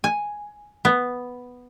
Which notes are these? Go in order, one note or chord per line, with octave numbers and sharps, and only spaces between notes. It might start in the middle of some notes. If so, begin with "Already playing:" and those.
G#5
B3